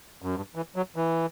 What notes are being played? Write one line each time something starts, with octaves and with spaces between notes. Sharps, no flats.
F#2
G2
E3
F#3
E3